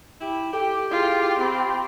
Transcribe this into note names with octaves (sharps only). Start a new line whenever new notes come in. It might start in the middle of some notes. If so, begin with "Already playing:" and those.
E4 G4
G4 A4 G5
E4 F4 G#4
C4 B5 C6